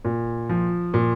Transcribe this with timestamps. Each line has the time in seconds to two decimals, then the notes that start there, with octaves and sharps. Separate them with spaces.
0.05 A#2
0.50 F3
0.94 A#2